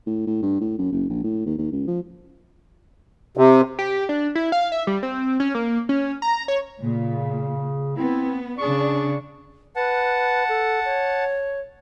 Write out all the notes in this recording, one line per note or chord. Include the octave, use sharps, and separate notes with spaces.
A2
A2
G2
A2
F#2
F#1
A#1
A2
D#2
D#2
C#2
F3
C3
G4
D4
E4
F5
E5
G3
C4
C#4
A#3
C#4
A#5
C#5
A#2 C#3
B3 C4 E4
C#3 D4 G#4 C#6
B4 F#5 A5
A4
C#5